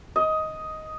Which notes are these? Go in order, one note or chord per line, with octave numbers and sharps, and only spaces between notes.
D#5